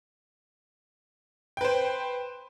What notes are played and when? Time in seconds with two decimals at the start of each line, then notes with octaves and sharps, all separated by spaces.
1.57 G5
1.61 B4
1.65 C5